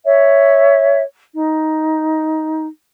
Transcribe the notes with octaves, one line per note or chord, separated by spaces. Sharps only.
C#5 E5
D#4